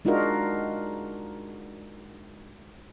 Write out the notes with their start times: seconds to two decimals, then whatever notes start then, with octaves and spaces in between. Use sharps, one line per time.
0.05 G#3 D4 D#4 F4 F#4 A#4